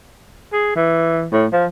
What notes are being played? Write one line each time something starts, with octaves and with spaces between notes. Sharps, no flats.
G#4
E3
A2
F3